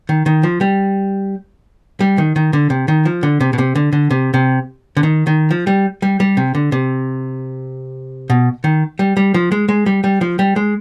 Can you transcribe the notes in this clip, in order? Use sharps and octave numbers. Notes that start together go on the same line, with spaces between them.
D#3
D#3
F3
G3
G3
D#3
D#3
D3
C3
D#3
F3
D3
C3
B2
C3
D3
D3
C3
C3
D3
D#3
D#3
F3
G3
G3
G3
C3
D3
C3
B2
D#3
G3
G3
F3
G#3
G#3
G3
G3
F3
G3
G#3